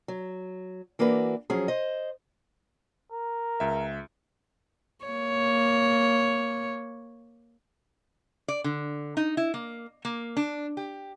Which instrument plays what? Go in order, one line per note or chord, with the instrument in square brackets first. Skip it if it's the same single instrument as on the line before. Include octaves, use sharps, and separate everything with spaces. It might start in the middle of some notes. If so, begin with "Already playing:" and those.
[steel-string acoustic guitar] F#3
E3 A#3 D4 F#4 B4
F3 F#3 C#4 G#4
C5 D#5
[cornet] A#4
[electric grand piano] C#2 E5
[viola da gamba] A#3 C#5
[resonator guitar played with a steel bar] D5
D3
D#4
E4
A#3
A#3
D4
G4